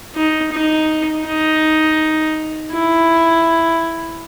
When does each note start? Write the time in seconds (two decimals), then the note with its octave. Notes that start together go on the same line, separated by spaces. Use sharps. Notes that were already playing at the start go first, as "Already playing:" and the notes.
0.15 D#4
0.52 D#4
1.25 D#4
2.71 E4